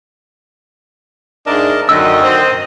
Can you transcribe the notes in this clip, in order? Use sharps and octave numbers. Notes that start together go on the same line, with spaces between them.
G#2 A3 D4 A#4 D5 D#5 A5
F#2 D3 D#3 D#5 E6
C4